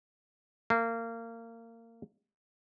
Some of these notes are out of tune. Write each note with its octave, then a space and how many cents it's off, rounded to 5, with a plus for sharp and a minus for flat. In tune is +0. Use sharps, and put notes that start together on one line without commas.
A#3 -25